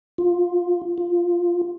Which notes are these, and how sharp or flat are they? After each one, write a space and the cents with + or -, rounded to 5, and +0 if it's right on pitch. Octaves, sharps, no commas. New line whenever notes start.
F4 +10
F4 +0